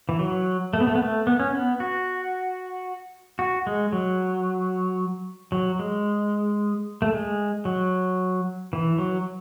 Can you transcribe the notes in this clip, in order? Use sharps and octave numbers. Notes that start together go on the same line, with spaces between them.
E3
F#3
A3
B3
A3
B3
A3
B3
C#4
B3
F#4
F#4
G#3
F#3
F#3
G#3
A3
G#3
F#3
E3
F#3